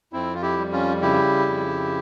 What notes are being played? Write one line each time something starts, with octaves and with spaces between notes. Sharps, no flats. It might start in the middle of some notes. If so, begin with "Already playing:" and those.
F2 C4 E4
F4
E4 G4
G3
C#4 F4
C#3 E4 G4
F2